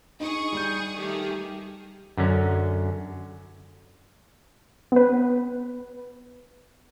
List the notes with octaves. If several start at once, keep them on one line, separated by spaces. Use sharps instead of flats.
D#4 G#4 C#6 D#6
G3 G6
D#3 A3 G4 G#4
F#2 D3 C#4
B3 B4